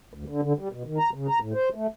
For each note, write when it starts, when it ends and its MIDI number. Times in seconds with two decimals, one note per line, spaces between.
0.14 0.24 38
0.28 0.41 50
0.43 0.53 50
0.59 0.68 55
0.72 0.83 47
0.85 0.98 51
0.98 1.10 82
1.14 1.27 49
1.28 1.39 82
1.41 1.53 45
1.54 1.69 72
1.75 1.87 57